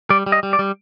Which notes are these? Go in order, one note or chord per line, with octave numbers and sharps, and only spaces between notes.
G3 D5
G3
D#5
G3
D5
G3